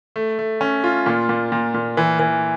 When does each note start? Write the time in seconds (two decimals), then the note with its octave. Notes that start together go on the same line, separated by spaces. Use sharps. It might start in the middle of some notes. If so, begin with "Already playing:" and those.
0.16 A3
0.39 A3
0.61 C#4
0.84 F4
1.06 A#2
1.29 A#2
1.52 A#2
1.74 A#2
1.97 E3
2.19 E3